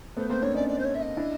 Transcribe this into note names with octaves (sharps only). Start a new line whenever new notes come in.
A3 B3 C5
A#3 C4 C5
C4 D4 C#5
C#4 D#4 D5
D5
C5
C#5
E5
D#5
D4 E4